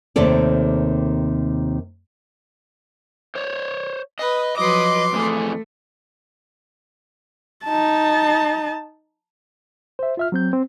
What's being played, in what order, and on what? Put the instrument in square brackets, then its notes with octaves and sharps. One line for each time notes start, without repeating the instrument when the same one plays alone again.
[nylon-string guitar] D#2 C3 D#3 A3 A4 D5
[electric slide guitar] C5 C#5
[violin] B4 [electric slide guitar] D#5
[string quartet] F3 F#3 B4 [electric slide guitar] D#5 [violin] C6 D6
[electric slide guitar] F2 E3 G#4 [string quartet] A3
[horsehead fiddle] D#4 A5
[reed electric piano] C5 E5
F4 E5 F6
F#3 C4 G6
C4